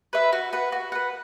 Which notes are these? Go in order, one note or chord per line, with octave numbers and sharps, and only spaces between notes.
B4 E5
F#4
B4 F#5
F#4
B4 F#5